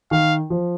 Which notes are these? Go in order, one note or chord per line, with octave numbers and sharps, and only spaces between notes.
D#3 F5
F3